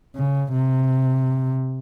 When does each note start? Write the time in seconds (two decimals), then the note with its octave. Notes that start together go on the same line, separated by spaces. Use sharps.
0.16 C#3
0.53 C3